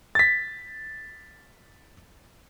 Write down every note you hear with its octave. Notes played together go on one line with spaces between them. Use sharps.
A6 B6